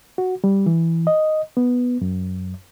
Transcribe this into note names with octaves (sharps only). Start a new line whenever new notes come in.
F#4
G3
E3
D#5
B3
F#2